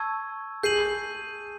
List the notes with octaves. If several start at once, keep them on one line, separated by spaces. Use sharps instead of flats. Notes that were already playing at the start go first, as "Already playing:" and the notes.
Already playing: A5 C#6 E6 G#6
G#4 G6 C7 D#7 F#7